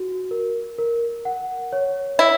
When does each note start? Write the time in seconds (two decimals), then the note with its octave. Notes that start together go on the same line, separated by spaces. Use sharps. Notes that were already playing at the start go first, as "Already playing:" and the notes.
Already playing: F#4
0.31 A#4
0.78 A#4
1.25 F#5
1.73 C#5
2.19 E4 C#5